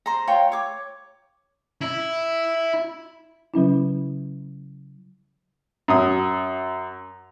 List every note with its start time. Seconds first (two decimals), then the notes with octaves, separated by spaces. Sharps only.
0.06 C5 A#5
0.27 F4 C#5 G5
0.52 C#5 D6
1.81 E4
3.54 C#3 F#3 C#4 E4
5.88 F#2 D#6